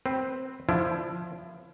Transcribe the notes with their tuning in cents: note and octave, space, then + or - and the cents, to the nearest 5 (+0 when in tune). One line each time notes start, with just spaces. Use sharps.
C4 +0 B4 +0
D3 +15 F3 +0 E4 +25